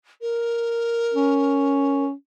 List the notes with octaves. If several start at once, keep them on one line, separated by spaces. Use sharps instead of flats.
A#4
C#4